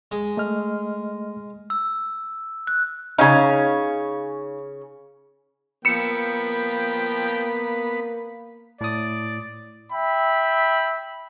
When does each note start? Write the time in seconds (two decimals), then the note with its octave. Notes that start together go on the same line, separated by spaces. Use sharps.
0.11 G#3
0.37 A3 D#5 F6
1.70 E6
2.67 F#6
3.18 C#3 C#4 D#4 F5
5.85 F3 A#3 B3 G5 B5 E6 C#7
8.81 A2 D5 D#6
9.91 E5 G5 B5